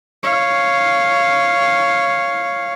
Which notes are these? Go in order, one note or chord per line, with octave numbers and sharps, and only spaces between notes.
C#5 F5